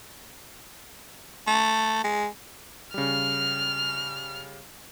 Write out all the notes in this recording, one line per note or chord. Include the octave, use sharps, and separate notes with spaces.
A3
G#3
C#3 G3 F6